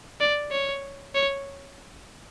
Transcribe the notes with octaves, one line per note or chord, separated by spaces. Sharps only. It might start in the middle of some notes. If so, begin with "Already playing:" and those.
D5
C#5
C#5